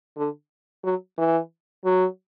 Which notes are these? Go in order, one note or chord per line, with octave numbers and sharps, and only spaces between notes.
D3
F#3
E3
F#3